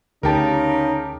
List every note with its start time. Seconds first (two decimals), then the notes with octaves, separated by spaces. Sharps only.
0.23 D2 C#3 D#4 G4 A#4 A5